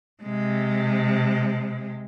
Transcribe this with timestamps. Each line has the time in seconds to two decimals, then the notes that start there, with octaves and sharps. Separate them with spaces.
0.23 C3 G#3